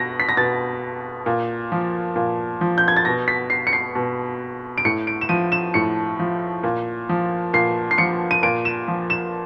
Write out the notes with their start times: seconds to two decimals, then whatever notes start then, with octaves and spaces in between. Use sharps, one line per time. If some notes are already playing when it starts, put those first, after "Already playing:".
Already playing: B2 A#6
0.20 B6
0.29 A#6
0.37 B2 A6
1.26 A#2
1.72 F3
2.16 A#2
2.61 F3
2.78 G6
2.88 G#6
2.97 A6
3.05 B2 A#6
3.28 B6
3.50 C7
3.67 C#7
3.73 C7
3.95 B2
4.78 D7
4.85 A2 C#7
5.07 D7
5.21 E7
5.29 F3 D#7
5.52 E7
5.74 A2 C#7
6.20 F3
6.63 A#2
7.09 F3
7.53 A#2 C7
7.91 C7
7.98 F3 C#7
8.31 D#7
8.43 A#2 D7
8.65 E7
8.88 F3
9.10 E7